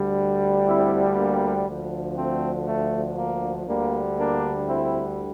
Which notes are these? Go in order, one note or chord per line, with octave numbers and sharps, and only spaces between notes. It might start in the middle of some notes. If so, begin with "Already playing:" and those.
Already playing: D2 D3 G3
C4 E4
A#3 D4
D2 D3 F3
A3 C4
A3
A#3
D2 D3 G3 A#3
A#3 D4
C4 E4